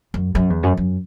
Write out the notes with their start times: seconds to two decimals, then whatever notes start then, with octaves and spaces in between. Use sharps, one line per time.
0.14 F#2
0.35 F#2
0.50 E2
0.63 F#2
0.77 F#2